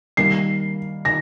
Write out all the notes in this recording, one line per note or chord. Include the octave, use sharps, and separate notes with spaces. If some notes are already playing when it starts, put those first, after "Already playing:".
D#3 G3 A#3 C7
D#3 A#6